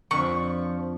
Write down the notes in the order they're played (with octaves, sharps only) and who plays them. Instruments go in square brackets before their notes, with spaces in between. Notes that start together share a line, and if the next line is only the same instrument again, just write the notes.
[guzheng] F2 D3 B5 [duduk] F3 [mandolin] C#6